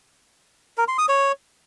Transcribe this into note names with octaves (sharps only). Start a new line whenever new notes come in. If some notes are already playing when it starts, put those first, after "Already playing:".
A#4
C6
D#6
C#5